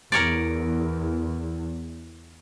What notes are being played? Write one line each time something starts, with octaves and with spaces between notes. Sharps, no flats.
E2 A#4 C#5 D5